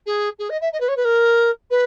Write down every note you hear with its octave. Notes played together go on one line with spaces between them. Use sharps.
G#4
G#4
D#5
E5
D#5
B4
C#5
B4
A#4
B4